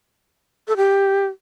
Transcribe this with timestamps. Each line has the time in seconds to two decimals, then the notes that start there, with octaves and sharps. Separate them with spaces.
0.68 A4
0.77 G4